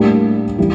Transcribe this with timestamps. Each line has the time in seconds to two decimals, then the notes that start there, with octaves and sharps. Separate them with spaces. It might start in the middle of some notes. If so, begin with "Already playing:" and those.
Already playing: A2 G3 A#3 D4 G4
0.59 E3 G3